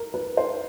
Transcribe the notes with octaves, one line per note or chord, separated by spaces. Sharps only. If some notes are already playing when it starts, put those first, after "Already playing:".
Already playing: A#4
B4
C5